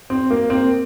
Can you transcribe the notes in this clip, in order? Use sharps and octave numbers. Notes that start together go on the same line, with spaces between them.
C4
A#3
C4